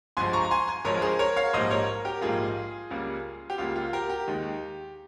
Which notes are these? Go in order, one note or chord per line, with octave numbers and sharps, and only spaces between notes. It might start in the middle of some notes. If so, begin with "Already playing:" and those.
G1 G2 F3 G#3 G#5 C6
A#5 C#6
A#5
G#5 C6
G#5 C6
G1 G2 F3 G#3 A#4 C#5
A#4
G#4 C5
A#4 C#5
C#5 F5
A#1 G#2 G3 A#3 C5 D#5
A#4 C#5
G4 A#4
A#1 G#2 G3 A#3 F4 G#4
C#2 C#3 G3 A#3
G4
C#2 C#3 G3 A#3 F4
F4
G4 A#4
G4
D#2 D#3 G#3